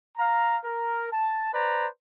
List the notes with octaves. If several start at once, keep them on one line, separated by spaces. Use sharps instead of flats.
F5 A#5
A#4
A5
B4 C5 D5 A#5